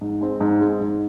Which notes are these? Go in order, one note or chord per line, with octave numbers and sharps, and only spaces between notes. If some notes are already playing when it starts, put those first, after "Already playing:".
G#2
G#3 C4
G#2
G#3 C4
G#2